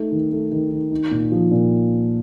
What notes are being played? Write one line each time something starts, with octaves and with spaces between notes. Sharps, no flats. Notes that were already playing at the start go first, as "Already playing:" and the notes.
Already playing: A3 D#4
D#3
A3
D#3
D#3
D#4
A#2
F3
A#2